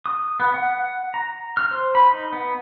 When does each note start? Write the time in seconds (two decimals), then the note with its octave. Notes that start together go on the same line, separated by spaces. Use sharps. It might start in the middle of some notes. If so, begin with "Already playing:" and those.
0.06 D#6
0.40 B3
0.54 F#5
0.78 F#5
1.14 A#5
1.57 F6
1.71 C5
1.95 B5
2.11 D#4
2.33 B3